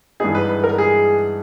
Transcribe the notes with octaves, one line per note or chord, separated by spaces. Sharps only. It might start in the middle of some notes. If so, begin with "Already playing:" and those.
G2 E3 G#3 B3 D#4 G#4
B4
B4
A#4
G#4